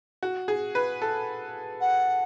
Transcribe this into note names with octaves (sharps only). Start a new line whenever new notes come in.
F#4
G#4
B4
A4
F#5